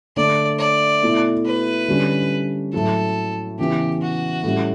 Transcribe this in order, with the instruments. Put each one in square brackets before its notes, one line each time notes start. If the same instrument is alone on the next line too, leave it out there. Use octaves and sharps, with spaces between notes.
[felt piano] D3 A3 D4 [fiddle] D5
[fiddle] D5
[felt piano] B2 A3 E4
[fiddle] B4
[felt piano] D3 G3 C#4
[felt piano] A2 F#3 A3 E4 [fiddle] A4
[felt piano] C#3 E3 B3 E4 [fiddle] G4
[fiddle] F#4
[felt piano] A2 G3 C#4